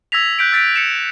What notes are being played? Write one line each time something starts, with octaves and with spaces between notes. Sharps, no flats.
E6 G#6 A#6 B6 F7
F#6 G6 B6 D7
E6 A6 B6 D7
C#7 E7